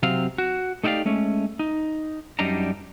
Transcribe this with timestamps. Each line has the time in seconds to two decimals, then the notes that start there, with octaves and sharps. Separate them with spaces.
0.03 C3 F#3 C4 F5
0.38 F#4
0.83 A3 D#4 E4 G4 D5 F5
1.05 G#3 A3 C#4
1.59 D#4
2.39 F#2 G3 D4 D#4 A#5